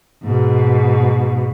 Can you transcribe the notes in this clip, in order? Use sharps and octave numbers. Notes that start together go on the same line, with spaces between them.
G#2 B2